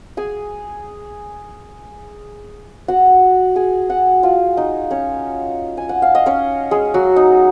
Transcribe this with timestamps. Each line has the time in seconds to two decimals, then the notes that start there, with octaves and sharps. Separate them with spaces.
0.17 G#4 G#5
2.88 F#4 F#5
3.56 G#4 G#5
3.89 F#4 F#5
4.23 F4 F5
4.57 D#4 D#5
4.91 C#4 C#5
5.77 G#5
5.89 F#5
6.02 F5
6.15 D#5
6.26 C#4 C#5
6.71 G#3 G#4
6.94 F#3 F#4
7.16 D#4